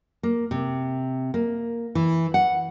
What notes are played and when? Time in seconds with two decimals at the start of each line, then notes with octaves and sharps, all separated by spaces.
0.23 A#3
0.51 C3
1.34 A#3
1.95 E3
2.34 F#5